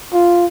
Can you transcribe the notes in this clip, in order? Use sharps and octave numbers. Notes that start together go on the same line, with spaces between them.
F4